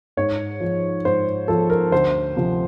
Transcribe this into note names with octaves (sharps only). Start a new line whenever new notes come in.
G#2 C#5
F3
G#2 C5
F3 A4
A#4
D2 C5
C3 F3